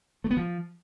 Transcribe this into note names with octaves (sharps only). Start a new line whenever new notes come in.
A3
B3
F3